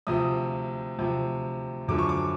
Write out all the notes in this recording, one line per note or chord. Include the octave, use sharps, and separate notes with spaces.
D2 C3 F3 D#6
D2 C3 F3
F#2 D3 F3 D6
C#6
D6